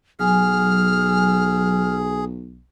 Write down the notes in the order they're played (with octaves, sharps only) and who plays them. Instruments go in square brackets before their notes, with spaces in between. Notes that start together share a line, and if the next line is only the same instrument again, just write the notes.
[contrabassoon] B1 [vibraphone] F#3 G#5 [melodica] G#4 [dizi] F6